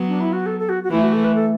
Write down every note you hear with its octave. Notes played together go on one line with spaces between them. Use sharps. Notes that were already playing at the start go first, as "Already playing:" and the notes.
Already playing: F#3 B3
D4
E4
F#4
A4
A4
F#4
F#4
E3 A3 E4
F#4
A4
B4
A4